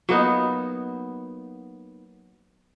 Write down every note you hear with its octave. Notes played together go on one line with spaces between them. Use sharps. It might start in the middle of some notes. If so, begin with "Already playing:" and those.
F#3 A#3 B3 D#4